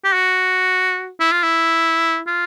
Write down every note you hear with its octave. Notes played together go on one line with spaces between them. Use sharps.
G4
F#4
E4
F4
E4
F4